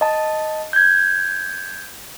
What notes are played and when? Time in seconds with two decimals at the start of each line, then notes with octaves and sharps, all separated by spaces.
0.01 D#5 A5
0.73 G6 G#6